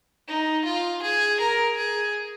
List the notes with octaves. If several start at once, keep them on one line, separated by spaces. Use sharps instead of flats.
D#4
F4
G#4
A#4
G#4